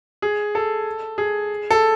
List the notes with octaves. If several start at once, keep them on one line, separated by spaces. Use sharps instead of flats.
G#4
A4
G#4
A4